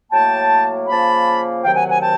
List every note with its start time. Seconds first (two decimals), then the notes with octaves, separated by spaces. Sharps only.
0.12 A2 F#3 A#3 G5 A5
0.88 C#3 F3 A#3 A5 B5
1.63 D2 C3 D#3 F#3 F5 G5
1.76 F#5 G#5
1.89 F#5 G#5
2.01 G5 A5